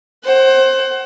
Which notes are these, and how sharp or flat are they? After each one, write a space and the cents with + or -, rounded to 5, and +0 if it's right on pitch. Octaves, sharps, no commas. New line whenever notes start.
C5 +20 F#5 +35